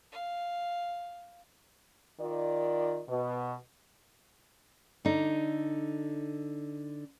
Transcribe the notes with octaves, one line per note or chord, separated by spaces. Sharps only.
F5
D#3 F4 D5
B2
D3 D#4